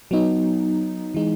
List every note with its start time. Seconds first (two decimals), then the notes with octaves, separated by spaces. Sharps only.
0.11 F#3 B3 D#4
1.14 E3 G#3 D#4